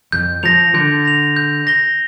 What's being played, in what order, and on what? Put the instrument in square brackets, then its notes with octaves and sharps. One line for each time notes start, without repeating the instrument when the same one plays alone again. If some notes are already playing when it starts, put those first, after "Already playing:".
[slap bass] F2 [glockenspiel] G6
[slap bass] F3 [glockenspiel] A#6 F7
[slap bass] D3 [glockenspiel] G6
[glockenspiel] A#6 F7
G6
A#6 G7